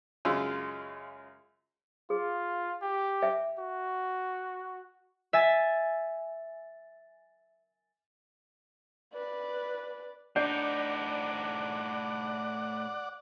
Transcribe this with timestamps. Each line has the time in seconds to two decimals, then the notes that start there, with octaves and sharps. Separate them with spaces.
0.25 F#2 C#3 G#3 F4 E6
2.10 F4 G#4
2.82 G4
3.23 E5
3.59 F#4
5.33 E5 G#5 A6
9.14 B4 D5
10.36 A2 D4 D#4 D5 F#5 G6 C7